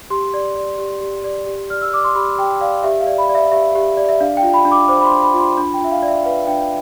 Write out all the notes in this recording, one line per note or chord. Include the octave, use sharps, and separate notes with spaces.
G4 C6
D5
D5
G4
G4
D5
G4
D5 F6
E6
D5 D6
C6
G4 B5
G4 G5
D5 F5
G4 E5
F5
D5
B5
D5
E5
G4 E5
G4
D5
E5
D4 F5
G5
F4
B5
D4
D6
C5 D6
B5
C6
D4
B5
F4
C6
D4 B5
G5
F4 E5
F5
D5
E5
B4 F5
D4 G5